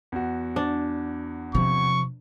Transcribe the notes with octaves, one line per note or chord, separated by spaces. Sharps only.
E2 F#4
D4
C3 F3 C#6